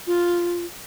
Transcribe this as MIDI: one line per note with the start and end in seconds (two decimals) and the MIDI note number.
0.07 0.65 65